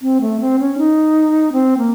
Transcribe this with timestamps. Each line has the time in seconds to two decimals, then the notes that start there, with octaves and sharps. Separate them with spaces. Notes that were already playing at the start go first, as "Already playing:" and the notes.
0.02 C4
0.21 A3
0.41 C4
0.59 C#4
0.78 D#4
1.53 C4
1.78 A#3